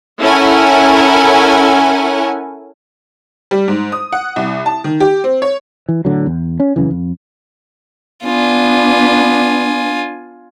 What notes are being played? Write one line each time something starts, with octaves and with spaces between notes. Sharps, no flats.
C#4 E4 A4 A#4 F#5 G#5
G3
G#2
D#6
F#5
C2
A5
D#3
G4
C4
C#5
E3
A2 D3 F#3
E2
C#4
F#2 C#3 E3
F2
B3 D4 F4 G#5